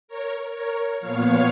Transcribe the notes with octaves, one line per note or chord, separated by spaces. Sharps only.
A#4 C#5
A#4 C#5
A#2 F3 B3 C#5 F5